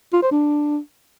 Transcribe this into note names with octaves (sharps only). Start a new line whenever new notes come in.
F4
C5
D4